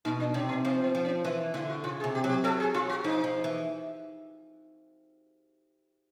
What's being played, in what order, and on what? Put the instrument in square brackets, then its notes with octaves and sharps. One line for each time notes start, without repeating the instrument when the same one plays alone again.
[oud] B2 [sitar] D#4
[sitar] D4
[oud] C3 [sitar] C#4
[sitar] B3
[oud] F3 [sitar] C4
[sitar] B3
[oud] F3
[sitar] C#4
[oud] E3 [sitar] E4
[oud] D3 [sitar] E4
[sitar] F#4
[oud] C#3 [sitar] F4
[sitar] G#4
[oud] C3
[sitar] G4
[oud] F#3
[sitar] G4
[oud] F#3 [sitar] A4
[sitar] G#4
[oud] F#3 [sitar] F4
[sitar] F#4
[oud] F3 [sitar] D#4
[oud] F3
E3